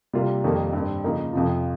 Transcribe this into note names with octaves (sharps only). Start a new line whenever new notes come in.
C3 G3 A#3 F4
F2 D#3 G3 A#3
G2 G3 C4
C#3 F3 A#3 D#4
F2 C3 F3